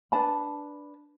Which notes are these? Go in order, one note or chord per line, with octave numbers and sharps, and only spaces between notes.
D4 B4 A5 B5